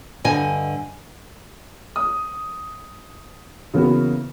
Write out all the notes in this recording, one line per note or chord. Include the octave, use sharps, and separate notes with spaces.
G2 D3 D#5 G#5
D#6
C#3 E3 A#3 B3 F#4